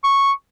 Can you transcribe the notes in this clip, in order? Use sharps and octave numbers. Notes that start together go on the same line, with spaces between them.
C#6